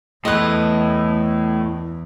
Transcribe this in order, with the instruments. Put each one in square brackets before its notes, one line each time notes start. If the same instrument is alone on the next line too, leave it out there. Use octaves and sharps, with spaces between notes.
[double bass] E2 [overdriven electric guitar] A2 [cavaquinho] B4 D#5